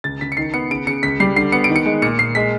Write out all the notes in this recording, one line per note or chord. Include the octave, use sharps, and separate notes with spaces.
C#2 A6
C#2 B6
C#7
D#3 C7
B3 C#7
C#3 D7
C#3 C#7
C#2 B6
G3 C7
D3 C7
B3 C#7
D7
D#3
C#7
G#3
A#2 C#7
A#2 C7
G#3 B6